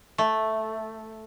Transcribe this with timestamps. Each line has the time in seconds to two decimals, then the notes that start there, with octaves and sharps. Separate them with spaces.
0.18 A3